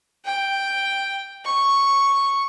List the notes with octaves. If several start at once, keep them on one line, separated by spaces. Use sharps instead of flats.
G5
C#6